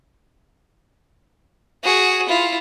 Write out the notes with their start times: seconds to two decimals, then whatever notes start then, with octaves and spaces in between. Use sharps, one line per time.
1.84 F#4 G#4
2.29 E4 F4